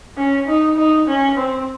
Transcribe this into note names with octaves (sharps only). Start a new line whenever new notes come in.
C#4
D#4
D#4
C#4
C4